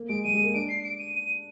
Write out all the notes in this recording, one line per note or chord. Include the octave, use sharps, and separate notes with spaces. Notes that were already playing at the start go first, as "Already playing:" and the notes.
Already playing: A#3
G#3 D7
G3 D#7
G#3
A#3
D4 D7
C7
D7
D#7
D#7